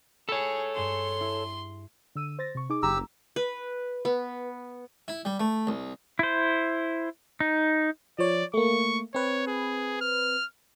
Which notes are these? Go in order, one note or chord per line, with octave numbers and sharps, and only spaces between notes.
G#4 A4 C#5 B5
G2 G#4 C6 E6
E4
D3 E6 D#7
C5 A6 A#6
C3 C#6
D#4 G#4 D6
F#1 G4 A#5 E6
B4
B3
E4
G3
A3
C2
E4 C5
D#4
F3 C#5 D5
A3 A#3 C#6
C4 B4 C#5
G#4
F6